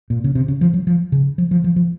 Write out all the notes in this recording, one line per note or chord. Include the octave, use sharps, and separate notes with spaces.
A#2
C#3
C3
C#3
F3
F#3
F3
C#3
F3
F3
F3
F3